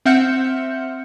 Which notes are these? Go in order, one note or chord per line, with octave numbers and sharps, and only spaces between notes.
C4 E5 F#5 F6 G6 C#7